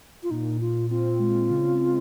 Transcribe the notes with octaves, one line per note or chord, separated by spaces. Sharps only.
F4
A#2 D#4
A#2 F4
C4 F4
G#3
C#3
G#3